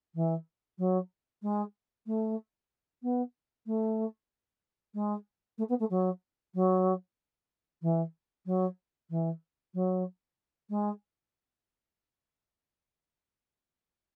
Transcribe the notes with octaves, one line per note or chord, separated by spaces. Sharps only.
E3
F#3
G#3
A3
B3
A3
G#3
A3
B3
A3
F#3
F#3
E3
F#3
E3
F#3
G#3